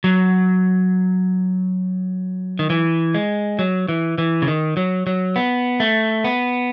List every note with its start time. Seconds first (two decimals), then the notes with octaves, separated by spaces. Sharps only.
0.04 F#3
2.59 D#3
2.70 E3
3.14 G#3
3.59 F#3
3.88 E3
4.18 E3
4.42 C#3
4.48 D#3
4.77 F#3
5.07 F#3
5.36 B3
5.80 A3
6.24 B3